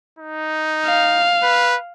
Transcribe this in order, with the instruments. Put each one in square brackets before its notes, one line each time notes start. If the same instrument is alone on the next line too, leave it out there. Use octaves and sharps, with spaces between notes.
[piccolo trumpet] D#4
[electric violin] F5
[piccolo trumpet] B4